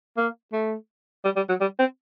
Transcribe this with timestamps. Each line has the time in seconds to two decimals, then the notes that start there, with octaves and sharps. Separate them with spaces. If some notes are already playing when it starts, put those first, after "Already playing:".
0.17 A#3
0.53 A3
1.25 G3
1.36 G3
1.49 F#3
1.61 G3
1.79 C4